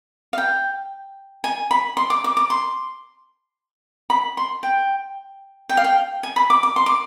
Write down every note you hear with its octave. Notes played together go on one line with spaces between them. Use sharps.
F5
G5
G#5
B5
C6
D6
D6
D6
C6
B5
C6
G5
G5
F5
G5
G#5
B5
D6
D6
C6
D6